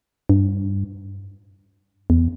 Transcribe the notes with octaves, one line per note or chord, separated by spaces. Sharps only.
G2
E2